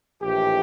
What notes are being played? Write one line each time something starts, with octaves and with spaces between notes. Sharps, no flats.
A#1 A2 E3 G4